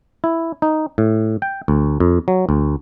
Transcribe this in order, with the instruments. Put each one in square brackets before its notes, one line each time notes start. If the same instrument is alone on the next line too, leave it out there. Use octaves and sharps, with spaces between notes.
[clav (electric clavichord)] E4
D#4
A2
G5
D2
F2
F#3
D2